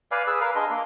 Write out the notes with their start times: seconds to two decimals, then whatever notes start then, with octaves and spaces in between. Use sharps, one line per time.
0.11 B4 D5 F5 G#5
0.27 G#4 B4 E6
0.41 A#4 B4 F5
0.55 D4 G#4 D#5 C6
0.70 A#3